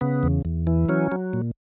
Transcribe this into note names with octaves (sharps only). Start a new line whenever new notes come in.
C#3 B3
E2
E2
E3
F#3 C#4
F#3
A#2